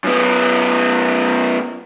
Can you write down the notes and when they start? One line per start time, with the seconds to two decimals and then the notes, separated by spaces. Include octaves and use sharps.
0.04 F#2 B3